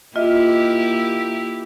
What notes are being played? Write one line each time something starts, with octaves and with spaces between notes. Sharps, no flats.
A#3 E4 F4 G4 D#5 E5